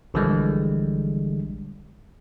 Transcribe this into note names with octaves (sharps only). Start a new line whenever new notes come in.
A#1 D3 E3 G3 G#3